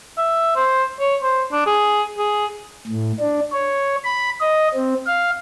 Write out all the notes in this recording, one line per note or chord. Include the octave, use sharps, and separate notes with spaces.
E5
C5
C#5
C5
D4
G#4
G#4
A2
D4
C#5
B5
D#5
C4
F5